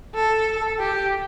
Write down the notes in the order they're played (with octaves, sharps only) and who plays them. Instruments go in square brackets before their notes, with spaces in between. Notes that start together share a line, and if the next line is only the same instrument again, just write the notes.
[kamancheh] A4
G4